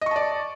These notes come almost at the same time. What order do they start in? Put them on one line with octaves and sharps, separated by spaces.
D#5 C#6 A5 D5